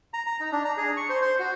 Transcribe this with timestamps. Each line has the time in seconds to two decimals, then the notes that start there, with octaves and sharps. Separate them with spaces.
0.14 A#5
0.27 A#5
0.40 D#4
0.52 D4
0.65 A#5
0.77 G#4
0.97 C#6
1.10 C5
1.21 C5
1.39 F#4